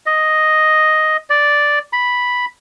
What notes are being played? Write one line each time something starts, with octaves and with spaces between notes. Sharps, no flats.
D#5
D5
B5